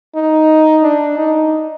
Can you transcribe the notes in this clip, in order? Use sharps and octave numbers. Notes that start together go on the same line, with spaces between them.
D#4
D4
D#4